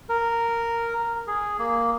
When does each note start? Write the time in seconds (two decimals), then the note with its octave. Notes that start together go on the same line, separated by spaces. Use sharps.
0.09 A#4
1.27 G#4
1.59 A#3